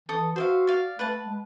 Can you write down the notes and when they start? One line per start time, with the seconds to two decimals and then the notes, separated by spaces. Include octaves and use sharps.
0.09 E3 A4 D#6
0.36 F#4 C5 E5 F5
0.67 D5 F5
0.99 A3 B4 F#5 A5
1.26 G#3